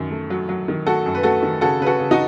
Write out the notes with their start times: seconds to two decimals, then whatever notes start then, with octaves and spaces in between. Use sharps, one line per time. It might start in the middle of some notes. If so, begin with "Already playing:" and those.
Already playing: F#2 D#3
0.11 A3
0.30 F#3
0.49 F#3
0.68 D#3
0.87 A3 F#4 A4
1.06 F#2
1.15 B4
1.23 A3 F#4 A4
1.43 D#3
1.61 C#3 F#4 A4
1.80 C#3 B4
1.86 F#4 A4
1.99 C#3
2.11 D#4 F#4